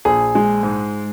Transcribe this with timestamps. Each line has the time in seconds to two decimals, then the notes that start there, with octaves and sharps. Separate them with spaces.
0.05 A#1 G#4
0.35 G#3
0.63 G#2